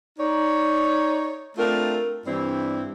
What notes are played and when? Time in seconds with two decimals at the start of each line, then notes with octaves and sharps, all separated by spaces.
0.19 D#4 C#5 D5
1.58 A3 C4 D4 F4 A#4
2.26 G2 E3 G3 C4 D4 E4